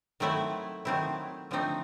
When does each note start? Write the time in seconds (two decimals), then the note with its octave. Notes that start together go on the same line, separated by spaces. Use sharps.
0.20 D#3 F#3 A3 C4 E4
0.85 D#3 F#3 A3 C4 E4
1.51 D3 F3 A3 C4 D#4